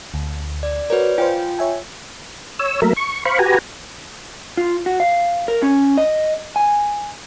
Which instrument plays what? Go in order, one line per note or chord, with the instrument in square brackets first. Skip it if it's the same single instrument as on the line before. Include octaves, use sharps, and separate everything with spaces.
[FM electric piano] D2
[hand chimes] D5
[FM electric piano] F#4 A#4 [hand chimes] B4 C#5 D5
[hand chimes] F4 G5 [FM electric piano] C5 F5 G#5
[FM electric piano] C#5 E5 G#5
[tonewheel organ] C#5 E6
F#3 A3 A#3 A#4 E5
C#6
C5 F5 B5 C#6
F#4 G4 B4 G#5 A#5
[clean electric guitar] F4
F#4
F5
A#4
C#4
D#5
G#5